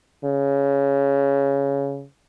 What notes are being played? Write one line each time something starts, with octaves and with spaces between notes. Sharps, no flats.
C#3